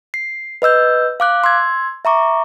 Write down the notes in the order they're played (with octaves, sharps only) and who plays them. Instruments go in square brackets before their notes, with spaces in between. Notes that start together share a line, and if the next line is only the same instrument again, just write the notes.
[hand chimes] C7
B4 D#5 E6 G6
F5 D6 F#6
C6 E6 G#6
E5 A#5 C#6 D6